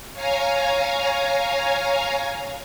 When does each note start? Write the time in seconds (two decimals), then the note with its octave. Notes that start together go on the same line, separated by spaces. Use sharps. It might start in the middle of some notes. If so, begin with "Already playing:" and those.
0.13 C#5 F5 G#5 A#5